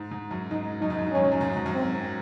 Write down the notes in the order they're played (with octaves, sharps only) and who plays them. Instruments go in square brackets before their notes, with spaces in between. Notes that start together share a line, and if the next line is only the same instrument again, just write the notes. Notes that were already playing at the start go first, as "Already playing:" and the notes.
Already playing: [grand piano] G#2
G#2
F#2
[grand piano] G#2 [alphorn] D#4
[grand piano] F#2 [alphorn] D#4
[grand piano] G#2
F#2
G#2
[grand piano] F#2 [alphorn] C#4
[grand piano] G#2
F#2
G#2
F#2
G#2
F#2
[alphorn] C4